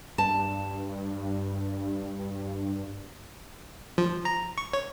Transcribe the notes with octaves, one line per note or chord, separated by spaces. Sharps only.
G2 A5
F3
A#5
C#6
C#5